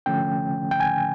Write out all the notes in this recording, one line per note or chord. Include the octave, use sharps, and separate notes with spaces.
D3 F3 A3 C#4 G5
G5
G#5